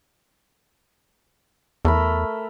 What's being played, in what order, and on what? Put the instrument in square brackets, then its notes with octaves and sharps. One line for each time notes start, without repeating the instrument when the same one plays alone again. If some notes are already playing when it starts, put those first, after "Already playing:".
[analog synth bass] E2 [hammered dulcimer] A3 A#4 B5